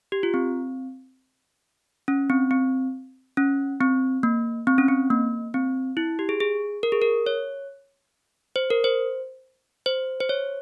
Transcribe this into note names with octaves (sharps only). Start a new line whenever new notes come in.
G4
F4
C4
C#4
C4
C4
C#4
C4
A#3
C4
C#4
C4
A#3
C4
E4
G4
G#4
G#4
A#4
G#4
A#4
C#5
C5
A#4
C5
C5
C5
C#5